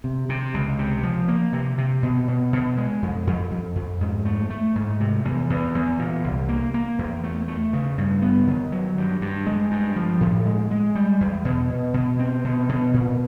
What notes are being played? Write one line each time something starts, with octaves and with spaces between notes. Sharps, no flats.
C3
C3
C#2
C3
F3
A#3
C3
C3
B2
B2
B2
G#3
F2
F2
F2
F2
G#2
A3
A3
G#2
C3
E2
E2
E2
A#2
C2
A#3
A#3
E2
A3
A3
C#3
G2
B3
D#3
F#3
G2
G2
G#3
G2
F3
A2
G#3
G#3
G3
E2
B2
B2
B2
C4
B2
B2
A#2